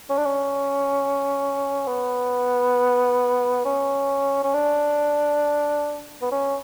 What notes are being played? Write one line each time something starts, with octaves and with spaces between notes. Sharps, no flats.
C#4
D4
C#4
B3
C#4
C#4
D4
B3
C#4